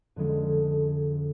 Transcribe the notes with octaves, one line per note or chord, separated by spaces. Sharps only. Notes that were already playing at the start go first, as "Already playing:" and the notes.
F2 D3 F3 G#3 C#4